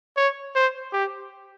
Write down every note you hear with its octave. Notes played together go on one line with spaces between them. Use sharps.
C#5
C5
G4